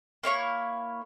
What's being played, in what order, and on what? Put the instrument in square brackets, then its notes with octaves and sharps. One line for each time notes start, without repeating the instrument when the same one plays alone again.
[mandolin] A#3 E4 C#5 C#6